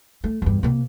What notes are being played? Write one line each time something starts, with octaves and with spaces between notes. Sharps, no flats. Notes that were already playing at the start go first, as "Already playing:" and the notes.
A3
E2 G2
C3 A#3